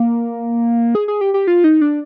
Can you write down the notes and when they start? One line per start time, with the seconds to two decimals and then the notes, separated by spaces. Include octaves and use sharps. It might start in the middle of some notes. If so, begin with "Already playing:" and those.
Already playing: A#3
0.95 G#4
1.08 G#4
1.21 G4
1.34 G4
1.47 F4
1.64 D#4
1.81 D4